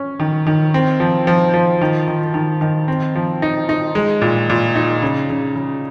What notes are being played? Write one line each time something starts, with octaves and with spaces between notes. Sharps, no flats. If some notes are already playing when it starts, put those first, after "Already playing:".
Already playing: C#4
D#3
D#3
C4
F3
F3
F3
D#3
D#3
D#3
D#3
C4
F3
D#4
D#4
G#3
A#2
A#2
D#4
C#3
C#3
C#3